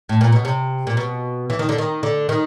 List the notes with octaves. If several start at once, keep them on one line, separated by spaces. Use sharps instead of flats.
A2
A#2
B2
C3
A#2
B2
E3
D#3
D3
D#3
D3
D#3